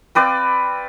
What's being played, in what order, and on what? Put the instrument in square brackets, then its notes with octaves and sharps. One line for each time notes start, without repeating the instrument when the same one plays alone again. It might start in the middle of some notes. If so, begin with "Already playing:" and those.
[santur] C4 B4 D5 F5